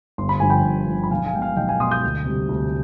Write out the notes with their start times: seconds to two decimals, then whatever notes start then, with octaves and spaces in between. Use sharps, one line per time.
0.18 G1 C6
0.29 B5
0.40 G2 D3 F3 G#5
0.50 G5 B5
0.64 G1
0.87 G2 D3 F3
1.03 B5
1.11 B1 F5 G#5
1.26 F5 G#5
1.34 B2 G#3 G5
1.41 F5 G#5
1.57 B1 D#5 G5
1.68 F5 G#5
1.80 B2 G#3 C6 D#6
1.91 D#6 G6
2.03 D2
2.25 C3 G3
2.49 D2